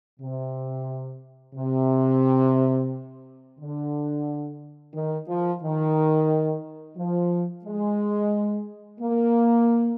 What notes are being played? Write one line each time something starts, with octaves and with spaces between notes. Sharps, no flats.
C3
C3
D3
D#3
F3
D#3
F3
G#3
A#3